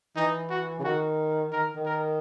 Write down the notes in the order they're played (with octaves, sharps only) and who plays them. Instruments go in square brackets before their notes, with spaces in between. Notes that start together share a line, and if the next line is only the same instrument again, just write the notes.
[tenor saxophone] E3 [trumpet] D#4
[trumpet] F#4
[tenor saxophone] C#3
[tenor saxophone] D#3 [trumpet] F#4
[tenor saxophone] D#3 [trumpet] A#4
[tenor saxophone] D#3
[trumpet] A#4